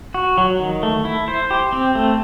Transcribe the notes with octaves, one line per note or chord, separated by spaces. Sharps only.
F#4
F#3
D#3
A3
E4
C5
G4
C4
A3